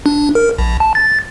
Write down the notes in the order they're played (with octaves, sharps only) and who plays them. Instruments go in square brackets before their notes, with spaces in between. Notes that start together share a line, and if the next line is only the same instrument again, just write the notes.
[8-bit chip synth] D4
A#4
A#1
A5
A6